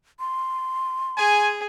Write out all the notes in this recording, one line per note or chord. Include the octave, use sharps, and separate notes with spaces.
C6
G#4 G#5